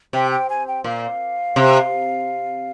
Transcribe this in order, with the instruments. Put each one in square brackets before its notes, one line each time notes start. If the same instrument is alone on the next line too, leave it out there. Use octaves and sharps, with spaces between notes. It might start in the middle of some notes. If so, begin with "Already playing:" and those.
[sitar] C3 [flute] G5
[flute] G5
G#5
G5
[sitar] A#2 [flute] F5
[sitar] C3